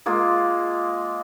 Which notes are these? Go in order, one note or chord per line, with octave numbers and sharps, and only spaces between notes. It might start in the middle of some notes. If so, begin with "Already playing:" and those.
G#3 A#3 F4